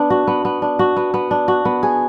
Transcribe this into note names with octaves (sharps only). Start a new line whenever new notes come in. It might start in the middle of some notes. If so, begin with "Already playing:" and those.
Already playing: B3 D4
F#4
B3
B3
D4
F#4
B3
B3
D4
F#4
B3
G#4